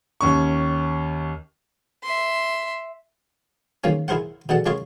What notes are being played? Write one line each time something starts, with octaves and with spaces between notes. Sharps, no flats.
D#2 C#4 C#6
E5 C6
D#3 F3 G#3 A#3 C#4
E4 G#4 A#4 C5 F#5
B2 D3 G#4 F#5 A5
G#3 C#4 F4 A#4 C#5 D#5